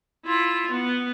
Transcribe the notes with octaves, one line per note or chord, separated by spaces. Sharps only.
E4 F4
B3